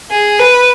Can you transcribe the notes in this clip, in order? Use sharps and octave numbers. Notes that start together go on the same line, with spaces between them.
G#4
B4